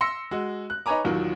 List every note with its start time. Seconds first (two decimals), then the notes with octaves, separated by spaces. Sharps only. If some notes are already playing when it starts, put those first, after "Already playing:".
0.01 C6 E6 A#6 C#7
0.31 G#3 F#4
0.70 F#6
0.86 D#4 B4 C#5 G#5 A#5 D6
1.05 A1 D#2 A#2 D#3 F#3